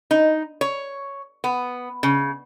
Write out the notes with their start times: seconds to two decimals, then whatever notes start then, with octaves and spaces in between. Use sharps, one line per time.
0.11 D#4
0.61 C#5
1.44 B3
2.03 C#3